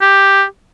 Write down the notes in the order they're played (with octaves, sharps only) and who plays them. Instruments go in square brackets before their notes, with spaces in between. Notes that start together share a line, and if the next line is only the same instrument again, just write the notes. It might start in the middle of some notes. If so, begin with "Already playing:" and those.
[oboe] G4